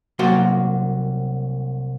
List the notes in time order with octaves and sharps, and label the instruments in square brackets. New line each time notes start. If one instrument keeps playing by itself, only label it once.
[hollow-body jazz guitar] C2 F#3 A#3 F#4 D5 C6